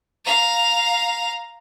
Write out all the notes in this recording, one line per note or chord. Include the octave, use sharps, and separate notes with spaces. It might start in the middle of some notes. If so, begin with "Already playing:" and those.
F5 A#5